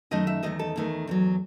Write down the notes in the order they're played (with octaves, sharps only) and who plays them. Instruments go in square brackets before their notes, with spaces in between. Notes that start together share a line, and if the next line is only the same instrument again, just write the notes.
[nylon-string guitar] F#2 D#3 A3 D#5
E5
E2 D#3 A3 D#5
A4
E2 D#3 A3
E2 D#3 F#3